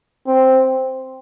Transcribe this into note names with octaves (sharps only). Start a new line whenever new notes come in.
C4